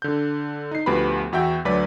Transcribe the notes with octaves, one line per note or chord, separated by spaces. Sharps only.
D3 G6
D#4 C7
D2 F3 B3 G4 B4 B5
E2 F#4 E5 G5 G6
D2 F#3 B4 D5 B6